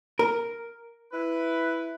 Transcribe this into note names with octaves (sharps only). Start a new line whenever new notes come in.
A#4
E4 B4